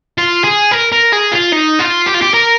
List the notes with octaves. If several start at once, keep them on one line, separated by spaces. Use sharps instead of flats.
F4
G#4
A#4
A#4
G#4
F4
D#4
F4
G4
F4
G4
A#4